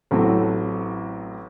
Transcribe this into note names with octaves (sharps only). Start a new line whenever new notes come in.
A1 A2 F#3 A3 C4